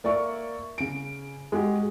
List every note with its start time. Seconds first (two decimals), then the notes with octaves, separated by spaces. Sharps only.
0.04 A#3 D5 E5 C#6
0.78 C#3 D7
1.52 G#3 F#4 G4